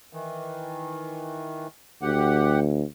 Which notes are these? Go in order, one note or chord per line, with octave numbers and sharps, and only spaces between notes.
D#3 E3
D2 G4 F#5